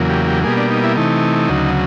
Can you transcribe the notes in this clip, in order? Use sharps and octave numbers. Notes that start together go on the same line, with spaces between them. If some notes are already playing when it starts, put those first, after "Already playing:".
Already playing: E2 C#3 F#3 A#3
G4
G4
B2 G3 A#3 G#4
D4
D#4
E4
C3 E3 A3 D#4
D2 C#3 F#3